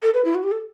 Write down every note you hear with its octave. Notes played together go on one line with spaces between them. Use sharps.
A4
B4
E4
F#4
G4
A4